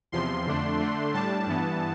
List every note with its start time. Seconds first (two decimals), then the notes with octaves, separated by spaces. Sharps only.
0.12 E2 C3 F3 C6
0.46 F2 D3 A3 D4
0.80 D3 A3 D4
1.13 A2 G3 D4 A5
1.47 G2 E3 B3